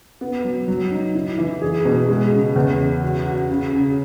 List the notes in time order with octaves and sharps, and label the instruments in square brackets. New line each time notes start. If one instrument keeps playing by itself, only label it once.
[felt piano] B3
F#3
F#3
D#4
E4
E3
G#4
B2
G#3
C#3
E2
C#3
F#4
F#4
C#3
C#3